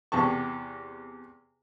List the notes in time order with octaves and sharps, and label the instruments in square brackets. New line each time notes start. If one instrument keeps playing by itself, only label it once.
[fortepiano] E2 C3 G4 A5 C#6